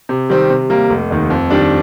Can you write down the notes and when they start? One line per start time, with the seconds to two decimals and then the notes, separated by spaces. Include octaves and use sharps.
0.09 C3
0.29 D#3 G3 C4
0.50 C3
0.70 G3 A#3
0.90 F1
1.11 D#2 D#3
1.30 F2
1.50 D#3 G3 D4